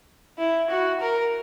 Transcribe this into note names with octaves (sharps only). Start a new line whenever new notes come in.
E4
F#4
A#4